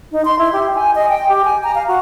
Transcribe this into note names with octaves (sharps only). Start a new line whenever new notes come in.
D#4
C6
E4
G4
G#5
D#5
G5
G4
G#5
A#5
F5
F#4